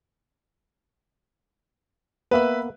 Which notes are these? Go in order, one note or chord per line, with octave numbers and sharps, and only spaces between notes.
A#3 B3 B4 E5 B5